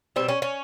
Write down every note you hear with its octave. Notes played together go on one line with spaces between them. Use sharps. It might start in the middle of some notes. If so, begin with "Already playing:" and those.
B2 G3 C4
C#4
C#4